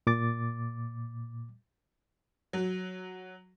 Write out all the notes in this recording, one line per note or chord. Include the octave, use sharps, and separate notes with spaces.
A#2 D6 A6
F#3